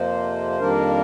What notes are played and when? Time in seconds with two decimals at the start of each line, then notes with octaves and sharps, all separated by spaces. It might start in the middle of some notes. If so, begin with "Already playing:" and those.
Already playing: F2 C3 F3 A#3 C5
0.60 F2 D#3 G3 A#3 D4 A#4